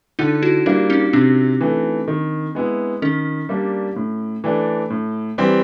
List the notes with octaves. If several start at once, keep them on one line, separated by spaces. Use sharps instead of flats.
D3 D#4 F4
E4 F#4
G3 A#3 D4 E4
C#4 D#4
C3 C4 D4
E3 A3
D#3
G#3 B3 E4
D#3 C#4
G3 A#3 D4
A2
E3 A3 D4
A2
E3 G3 C4